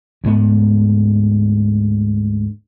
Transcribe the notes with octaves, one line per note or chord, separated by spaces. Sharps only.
D2 G#2 B3